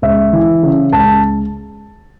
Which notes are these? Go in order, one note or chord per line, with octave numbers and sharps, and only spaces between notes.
C#2 E5
E3
C#3
C#2 A5